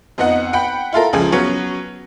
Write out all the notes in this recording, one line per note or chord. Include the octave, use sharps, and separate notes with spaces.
F2 B3 D#4 F#5
F#5 G5 B5
E4 F4 A4 A#4
C#2 C#3 F3 G#4 G#5
F#3 B3 C#4